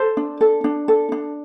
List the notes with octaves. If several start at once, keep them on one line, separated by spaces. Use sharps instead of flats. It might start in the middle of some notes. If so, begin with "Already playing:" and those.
Already playing: A4 C5
D4
A4
D4
A4
D4